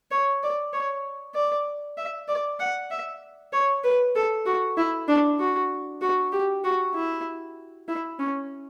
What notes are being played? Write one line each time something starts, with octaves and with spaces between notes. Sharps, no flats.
C#5
D5
C#5
D5
E5
D5
F#5
E5
C#5
B4
A4
F#4
E4
D4
F#4
F#4
G4
F#4
E4
E4
C#4